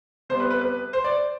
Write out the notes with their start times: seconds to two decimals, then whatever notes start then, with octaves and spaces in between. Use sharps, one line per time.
0.29 C3 G3 B3 C5
0.40 B4
0.51 B4
0.61 B4
0.93 C5
1.04 D5